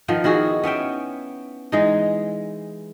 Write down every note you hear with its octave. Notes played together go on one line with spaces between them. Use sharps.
D#3 F3 B3
D#3 E4 F#4 G#4
B3 C#4 E5 G5
E3 G#3 D#4